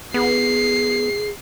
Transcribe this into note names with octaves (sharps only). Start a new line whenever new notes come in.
B3 G#4 C7